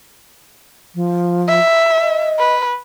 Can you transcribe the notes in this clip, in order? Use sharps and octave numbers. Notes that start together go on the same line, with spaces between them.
F3
E5
D#5
B4